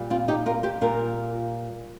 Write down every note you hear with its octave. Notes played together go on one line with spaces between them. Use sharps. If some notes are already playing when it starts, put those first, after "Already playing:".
Already playing: A#2 G3
C4 F4
D#4 G4
F4 A#4
G4 C5
A#2 G3 F4 A#4